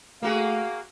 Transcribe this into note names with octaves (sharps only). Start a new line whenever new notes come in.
A3 A#3 F#4 G#4 F5